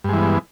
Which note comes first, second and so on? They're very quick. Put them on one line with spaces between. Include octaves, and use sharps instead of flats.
G2 G#3 E3 B3